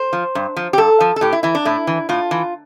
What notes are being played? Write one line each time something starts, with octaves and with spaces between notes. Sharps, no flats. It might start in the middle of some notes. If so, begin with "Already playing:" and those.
Already playing: C5
F3
G2
F3
G4
G2 A4
F3
A4
A2 G4
E4
E3 E4
D4
A2 E4
E3
A2 F4
E3